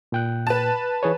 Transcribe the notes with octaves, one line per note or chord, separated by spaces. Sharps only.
A#2 G5 F#6
B4 A5
E3 G#4 C#5